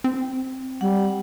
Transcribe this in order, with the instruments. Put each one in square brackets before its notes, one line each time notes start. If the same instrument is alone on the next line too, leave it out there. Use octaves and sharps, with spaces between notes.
[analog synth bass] C4
[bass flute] G3 [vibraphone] F#5